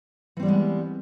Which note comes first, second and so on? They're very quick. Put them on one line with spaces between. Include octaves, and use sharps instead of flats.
E3 C4 G3 B3 G#3